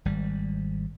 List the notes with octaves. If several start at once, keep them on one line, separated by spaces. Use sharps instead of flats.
G#1 G3